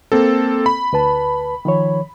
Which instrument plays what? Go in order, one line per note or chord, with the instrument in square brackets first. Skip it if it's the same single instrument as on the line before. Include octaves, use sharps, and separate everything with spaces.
[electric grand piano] A#3 C4 A4
B5
[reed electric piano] D2 B4 A5
D#3 F3 C#5